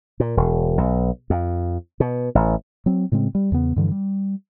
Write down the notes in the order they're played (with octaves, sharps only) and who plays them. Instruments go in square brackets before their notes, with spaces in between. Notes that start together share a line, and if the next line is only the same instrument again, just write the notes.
[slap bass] A#2
E1
B1
F2
B2
A1
[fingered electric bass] F#3 C4
A2 C#3 G#3 C4
G3
E2 C#3 B3
G2 D3 E3 F3
G3